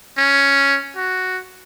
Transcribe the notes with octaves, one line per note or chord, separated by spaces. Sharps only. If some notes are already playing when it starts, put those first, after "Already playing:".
C#4
F#4